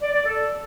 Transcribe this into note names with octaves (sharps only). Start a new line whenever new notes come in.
D5
D5
A4